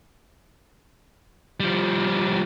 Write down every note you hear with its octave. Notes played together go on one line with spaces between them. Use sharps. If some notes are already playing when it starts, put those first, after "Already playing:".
F3 G3